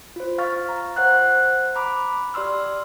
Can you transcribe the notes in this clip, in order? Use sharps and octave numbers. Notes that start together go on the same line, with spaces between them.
F4 C5
F5 C#6 F6 A6
A#5
C5 F#5 F#6
A#5 B5 D6
G4 D5 C6 E6 F6